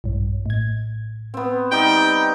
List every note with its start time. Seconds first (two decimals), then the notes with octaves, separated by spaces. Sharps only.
0.04 A#1 G2
0.46 A2 G#6
1.34 B3 C4
1.72 G3 D#4 G5